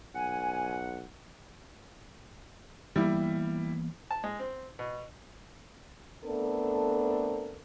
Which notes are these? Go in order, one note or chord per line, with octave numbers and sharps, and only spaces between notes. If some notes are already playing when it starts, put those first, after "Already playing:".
B1 F#5 G#5
E3 G3 A#3 B3 E4
A5
G#3
C4
B2
A3 B3 C4 D4 A4 A#4